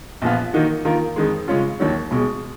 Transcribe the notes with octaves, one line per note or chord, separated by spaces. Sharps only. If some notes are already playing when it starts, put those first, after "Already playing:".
A#1 A#2 F3 B3 F4
D#3 A#3 D#4 F#4
D#3 A#3 F4 A#4
F2 D#3 G#3
C#3 G#3 C#4 F4
D#2 D#3 F#3
B1 B2 G#3